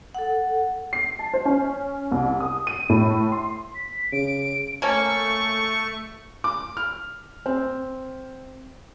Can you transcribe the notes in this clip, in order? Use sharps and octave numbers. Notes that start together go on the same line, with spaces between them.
A4 F#5
C7
A5
C5
C#4
C2
D#6
D#7
A2
C6
B6
C#3 D7
A3 A#3 C#4 A4 C#6
D6
F6
C4